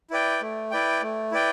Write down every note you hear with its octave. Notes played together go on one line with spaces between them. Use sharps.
E4 B4 D5 G5
A3
E4 B4 D5 G5
A3
E4 B4 D5 G5